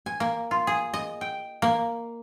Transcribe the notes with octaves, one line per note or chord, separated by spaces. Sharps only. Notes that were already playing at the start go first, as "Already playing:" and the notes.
G#5
A#3
F4
G#4
D#5
G5
A#3